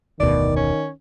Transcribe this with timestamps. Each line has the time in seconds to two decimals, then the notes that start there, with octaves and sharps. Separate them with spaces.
0.20 F1 D2 B2 D#3 D5
0.56 C#4